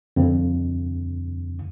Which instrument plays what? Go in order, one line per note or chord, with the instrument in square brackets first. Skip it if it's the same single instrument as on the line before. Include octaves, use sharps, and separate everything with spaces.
[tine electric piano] F2 D3